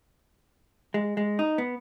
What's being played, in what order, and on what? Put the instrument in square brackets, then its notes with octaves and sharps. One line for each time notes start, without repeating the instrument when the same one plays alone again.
[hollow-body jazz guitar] G#3
G#3
D#4
B3